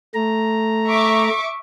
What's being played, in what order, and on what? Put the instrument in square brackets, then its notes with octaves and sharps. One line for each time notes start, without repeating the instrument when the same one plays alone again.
[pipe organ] A3 A#5
[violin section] E5 C#6 D6